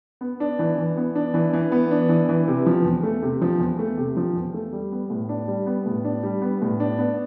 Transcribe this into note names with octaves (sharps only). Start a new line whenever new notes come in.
B3
D4
E3
E3
B3
D4
E3
E3
B3
D4
E3
E3
C3
F3
E2
A3
C3
F3
E2
A3
C3
F3
E2
A3
G3
B3
A2
D4
G3
B3
A2
D4
G3
B3
A2
D4
B3